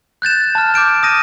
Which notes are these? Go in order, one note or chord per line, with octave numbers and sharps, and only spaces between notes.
F#6 G6 A6 E7
A5 F6
D6 G6 D7 E7
D#6 A#6 D#7